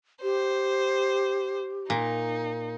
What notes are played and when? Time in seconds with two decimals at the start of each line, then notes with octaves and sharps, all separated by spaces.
0.23 G4 C5
1.90 A#2 D#4